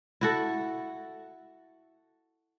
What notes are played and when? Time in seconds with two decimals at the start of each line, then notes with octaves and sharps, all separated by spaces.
0.21 E4 F#4 A4